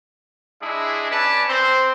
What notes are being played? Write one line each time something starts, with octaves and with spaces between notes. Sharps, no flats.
G#3 D4 E4 G#4
C#4 B4 D5 A5
C4 C5